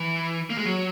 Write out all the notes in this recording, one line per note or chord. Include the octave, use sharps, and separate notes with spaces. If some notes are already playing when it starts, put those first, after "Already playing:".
Already playing: E3
A#3
G#3
F#3